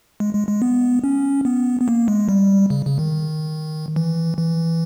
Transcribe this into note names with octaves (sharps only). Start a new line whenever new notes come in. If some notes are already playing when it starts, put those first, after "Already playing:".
G#3
G#3
G#3
B3
C#4
B3
B3
A#3
G#3
G3
C#3
C#3
D#3
E3
E3